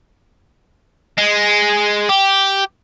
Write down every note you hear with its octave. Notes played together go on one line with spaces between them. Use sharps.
G#3
G4